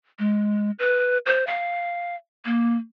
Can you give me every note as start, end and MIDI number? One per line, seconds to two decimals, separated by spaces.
0.19 0.71 56
0.79 1.18 71
1.26 1.44 72
1.47 2.15 77
2.45 2.76 58